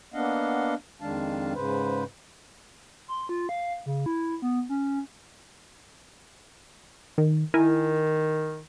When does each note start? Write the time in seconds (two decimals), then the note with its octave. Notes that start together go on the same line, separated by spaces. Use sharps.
0.14 A#3 B3 D4 D#5 F5 F#5
1.01 F2 D#3 G#3 D4 F5 A5
1.54 G#2 C#3 B4 C5
3.08 C6
3.29 F4
3.49 F5
3.86 C#3
4.06 E4
4.42 B3
4.69 C#4
7.18 D#3
7.54 D#3 E4 A#4 G#5